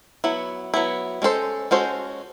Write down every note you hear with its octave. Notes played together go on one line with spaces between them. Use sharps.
F#3 B3 E4
F#3 B3 E4
G#3 C#4 F#4 A4 C5
G#3 C#4 F#4 A4 C5